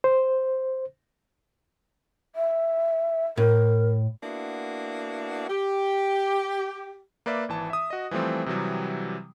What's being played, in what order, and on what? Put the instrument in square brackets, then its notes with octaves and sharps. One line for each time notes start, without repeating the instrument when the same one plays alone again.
[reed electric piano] C5
[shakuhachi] E5
[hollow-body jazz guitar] A2 [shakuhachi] A#4
[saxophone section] A#3 B3 D4 E4 F#4
G4
[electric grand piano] A#3 B4 D5 E5
G#1 E3 A5
E5 D#6
F#4 D#5
E3 F3 G3 A3 C4
C3 E3 F#3 G3